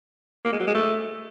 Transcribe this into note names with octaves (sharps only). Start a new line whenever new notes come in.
A#3
G#3
F#3
G#3
A3